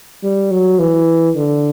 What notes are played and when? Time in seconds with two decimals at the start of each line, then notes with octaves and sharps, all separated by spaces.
0.23 G3
0.51 F#3
0.79 E3
1.36 D3